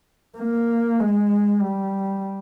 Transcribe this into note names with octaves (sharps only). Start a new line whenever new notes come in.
A#3
G#3
G3